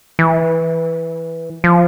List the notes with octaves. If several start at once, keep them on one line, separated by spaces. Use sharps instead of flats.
E3
F3